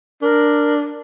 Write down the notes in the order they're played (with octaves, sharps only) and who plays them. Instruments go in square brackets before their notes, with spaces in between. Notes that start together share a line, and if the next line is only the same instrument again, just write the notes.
[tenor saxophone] D4 [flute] A#4